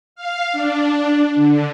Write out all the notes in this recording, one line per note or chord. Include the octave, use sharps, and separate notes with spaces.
F5
D4
D3